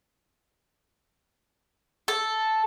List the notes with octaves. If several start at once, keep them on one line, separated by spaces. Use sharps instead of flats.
A4